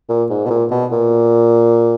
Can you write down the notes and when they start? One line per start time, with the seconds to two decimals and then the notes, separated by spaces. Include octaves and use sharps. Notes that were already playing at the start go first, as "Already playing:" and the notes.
0.09 A#2
0.30 G#2
0.46 B2
0.50 A#2
0.71 B2
0.92 A#2